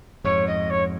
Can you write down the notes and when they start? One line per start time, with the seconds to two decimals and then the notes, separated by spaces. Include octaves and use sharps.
0.24 F2 G#2 C#5
0.47 D#5
0.70 C#5